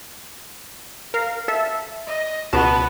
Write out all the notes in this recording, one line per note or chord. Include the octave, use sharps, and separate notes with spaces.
A#4 F5
A4 E5
D#5
C#2 B2 B3 A5